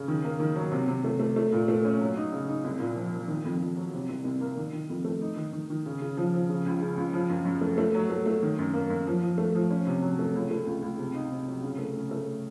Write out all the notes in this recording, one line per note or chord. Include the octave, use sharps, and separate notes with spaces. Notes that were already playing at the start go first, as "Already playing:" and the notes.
Already playing: C#3
D#3
A#3
D#3
F#3
C3
C3
A3
A3
A3
A#2
A3
C#4
F#3
D#4
C#3
D#4
C2
A#2
F3
F3
D#3
F2
F2
F#3
C3
C2
C2
A#3
D#3
D#3
F2
A3
D#4
D#3
D#3
D#3
C#3
C#3
F3
F3
C#3
C#2
C#3
C#2
F3
F#2
F#2
A3
A3
F#3
A3
A3
D#3
F#2
A#3
F#2
F3
F3
A3
F3
C#4
C3
F#3
A3
C#2
A3
C#2
C#2
C3
D#4
C3
F#3
C#3
A3
C#3
A3